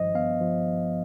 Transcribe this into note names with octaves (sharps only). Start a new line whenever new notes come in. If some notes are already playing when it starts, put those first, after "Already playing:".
Already playing: G#1 G2 F3 C5 D#5
B3 F5
F3